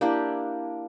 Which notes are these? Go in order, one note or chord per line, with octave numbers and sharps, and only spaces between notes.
A#3 D4 E4 G4